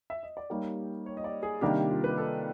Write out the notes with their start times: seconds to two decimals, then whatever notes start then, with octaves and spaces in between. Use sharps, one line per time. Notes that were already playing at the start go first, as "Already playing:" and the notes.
0.10 E5
0.23 D#5
0.37 D5
0.50 G3 A#3 D#4 G4 C#5
1.06 C#5
1.17 D#5
1.24 D5
1.43 G#4
1.61 C3 D#3 G3 A#3 D4 G4
1.90 F4
2.04 B4
2.18 A4